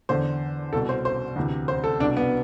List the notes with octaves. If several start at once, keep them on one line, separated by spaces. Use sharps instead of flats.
E2 D3 C5
C2 B2 A4
C5
C5
D2 C3 E3
C5
A4
C2 B2 D4
B3